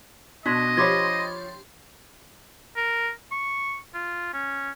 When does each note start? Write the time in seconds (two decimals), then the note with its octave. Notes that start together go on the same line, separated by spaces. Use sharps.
0.46 B2 D4 D#5 C6 G#6 B6
0.77 F3 G4 C#5 B5 C6 D6 G#6 A6
2.76 A#4
3.32 C#6
3.94 F4
4.33 C#4